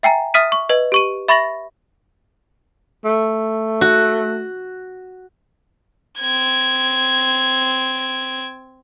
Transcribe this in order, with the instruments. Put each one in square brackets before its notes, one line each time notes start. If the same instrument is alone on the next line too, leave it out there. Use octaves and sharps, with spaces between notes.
[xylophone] E5 G5 G#5 A#5
E5 D#6 F6 B6 D#7
C#6
B4 D#5
G4 C#6 D#7
E5 B5 C#6 A6 A#6 F#7
[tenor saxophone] A3
[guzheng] F#4
[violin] C4 G#6